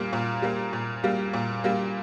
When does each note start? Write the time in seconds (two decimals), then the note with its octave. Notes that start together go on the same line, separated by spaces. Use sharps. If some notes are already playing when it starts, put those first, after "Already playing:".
Already playing: A#2 G3 A#3
0.13 A#2
0.42 G3 A#3
0.73 A#2
1.04 G3 A#3
1.33 A#2
1.64 G3 A#3